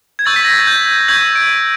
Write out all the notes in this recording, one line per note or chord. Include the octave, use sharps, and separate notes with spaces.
G#6
C#6 E6 G6 A6
B6
A#6
A6
G#6
G6
C#6 E6 G6 G#6
D7